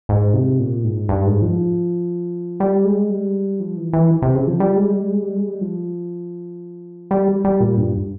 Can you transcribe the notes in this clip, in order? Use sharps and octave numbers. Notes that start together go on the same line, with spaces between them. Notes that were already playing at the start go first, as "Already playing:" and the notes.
G#2
C3
A#2
G#2
G2
G#2
F3
G3
G#3
G3
F3
E3
E3
C3
C#3
F3
G3
G#3
G3
G#3
G3
G#3
G3
F3
G3
G3
A#2
G2